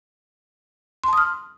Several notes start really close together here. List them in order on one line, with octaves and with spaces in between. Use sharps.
C6 A5 D#6 F6